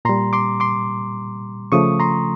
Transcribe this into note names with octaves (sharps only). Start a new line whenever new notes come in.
A#2 G3 A#5 C6
C6 D6
C6 D6
C#3 F3 A3 C#6 D#6
A#5 C6